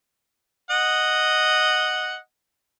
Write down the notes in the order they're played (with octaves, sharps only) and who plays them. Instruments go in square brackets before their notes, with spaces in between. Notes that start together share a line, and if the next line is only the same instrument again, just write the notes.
[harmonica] D#5 F#5